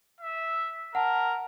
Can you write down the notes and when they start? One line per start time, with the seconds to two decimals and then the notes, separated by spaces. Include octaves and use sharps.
0.21 E5
0.95 A#4 F#5 A5